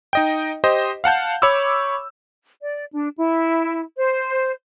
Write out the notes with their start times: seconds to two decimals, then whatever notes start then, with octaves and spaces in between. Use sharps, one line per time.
0.13 D#4 D#5 G5
0.64 G4 C5 D#5
1.04 F5 F#5 A5 G6
1.42 C#5 B5 C#6 D6 E6
2.60 D5
2.92 D4
3.17 E4
3.96 C5